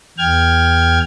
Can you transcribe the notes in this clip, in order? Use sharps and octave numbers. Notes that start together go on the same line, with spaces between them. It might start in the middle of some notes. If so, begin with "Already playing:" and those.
E2 G5 F6 G#6